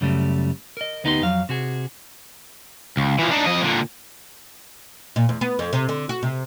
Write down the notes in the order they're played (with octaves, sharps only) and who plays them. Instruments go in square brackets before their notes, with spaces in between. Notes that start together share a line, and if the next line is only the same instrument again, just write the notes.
[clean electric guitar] F#2 C#3 G3 A3
A#4 D#5
D2 B3 D#4 E4 G4 C6
F2 F#3 F5
C3 F#4 G#4
[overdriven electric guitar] C#2
E3 F3
D4 D#4
F2 D#5
A#2 D3
[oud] A#2
E2
B3
F2
C3
D3
F#4
C3